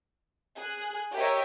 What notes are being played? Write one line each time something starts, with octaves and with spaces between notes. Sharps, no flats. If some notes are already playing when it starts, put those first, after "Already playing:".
G#4 F#6
G4 A#4 C#5 D#5 E5